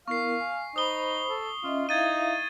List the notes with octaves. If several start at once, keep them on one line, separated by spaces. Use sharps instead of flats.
B3 E4 A#4 F5 C#6 C7
G#5
D#4 C5 B5 D#6 G7
A4
C#4 F4 D#5 E5
D#4 E4 E5 F5 G#6 A6 D#7